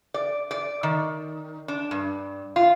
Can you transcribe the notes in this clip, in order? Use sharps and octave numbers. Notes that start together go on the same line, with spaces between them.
D5
D5
D#3
D4
G2
F4